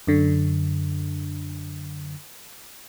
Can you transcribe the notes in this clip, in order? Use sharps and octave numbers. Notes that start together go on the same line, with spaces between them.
F#2 D3